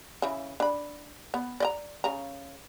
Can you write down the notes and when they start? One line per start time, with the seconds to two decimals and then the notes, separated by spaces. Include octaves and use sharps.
0.22 C#3 E3
0.60 D4 B5
1.34 B3
1.60 D5 D#5 A#5
2.04 C#3 A#5